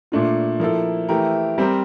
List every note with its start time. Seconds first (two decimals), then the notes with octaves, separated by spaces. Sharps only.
0.12 A#2 A3 D4 F4
0.60 F3 A#3 E4 A4
1.09 E3 A3 E4 G4 A#4
1.58 G3 C4 G4 A#4